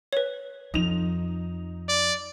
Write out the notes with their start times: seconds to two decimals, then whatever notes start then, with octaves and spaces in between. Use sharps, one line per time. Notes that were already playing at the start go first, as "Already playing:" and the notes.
0.13 B4 C#5
0.74 F2 F3 D#4 F7
1.89 D5